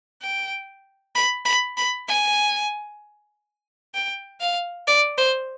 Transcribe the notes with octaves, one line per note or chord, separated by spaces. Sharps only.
G5
B5
B5
B5
G#5
G5
F5
D5
C5